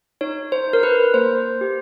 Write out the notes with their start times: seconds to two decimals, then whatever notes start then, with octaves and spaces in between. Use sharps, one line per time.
0.21 D#4 C#5
0.52 C5
0.67 D#4
0.73 A#4
0.83 B4
1.14 A#3 C5
1.61 G4